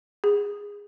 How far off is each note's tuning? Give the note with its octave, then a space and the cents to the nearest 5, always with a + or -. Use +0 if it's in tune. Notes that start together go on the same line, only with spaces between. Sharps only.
G#4 -15